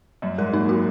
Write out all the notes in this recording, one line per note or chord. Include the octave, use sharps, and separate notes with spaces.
F#2 F#3
G#2 A#4
A#2 D#4
A#2 F#4